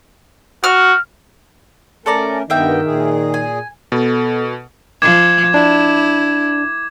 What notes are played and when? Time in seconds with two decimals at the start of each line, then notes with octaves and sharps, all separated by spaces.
0.64 F#4 F6
2.06 A3 C#4 A4 A#4 D5 A#5
2.50 G2 D#3 A#3 B3 D#5 E5 G5
2.85 A#2 G#4
3.34 G#5
3.92 B2 B3 A4
5.02 F3 D6 G#6 E7
5.54 D4 E4